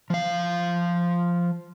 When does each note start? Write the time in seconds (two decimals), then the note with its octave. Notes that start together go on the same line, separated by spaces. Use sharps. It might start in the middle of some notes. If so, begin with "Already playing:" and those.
0.10 F3 F5